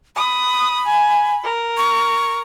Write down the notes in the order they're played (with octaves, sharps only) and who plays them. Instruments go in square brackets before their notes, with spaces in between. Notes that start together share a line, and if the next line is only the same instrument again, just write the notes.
[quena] B5 [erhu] D#6
[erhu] G#5
A#4
[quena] C#6